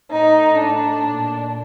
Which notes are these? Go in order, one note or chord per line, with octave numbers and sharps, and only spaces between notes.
A2 D#4
D4
A#2